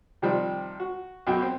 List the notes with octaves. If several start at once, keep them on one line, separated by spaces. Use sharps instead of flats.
C3 D#3 F3 G3 C4
F#4
B1 F#2 B2 F#4 G5
C4